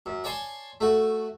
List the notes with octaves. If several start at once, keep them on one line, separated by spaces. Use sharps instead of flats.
F#2
C#5 D5 G#5 A5 C6
A3 F#4